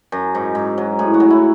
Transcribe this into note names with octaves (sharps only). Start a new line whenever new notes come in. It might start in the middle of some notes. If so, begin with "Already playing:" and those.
F#2
G#2
G#2
F#3
A2 G#4
F#4
F#3
E4